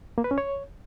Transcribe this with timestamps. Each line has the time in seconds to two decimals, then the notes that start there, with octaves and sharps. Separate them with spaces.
0.18 A#3
0.24 B4
0.31 C#4
0.38 C#5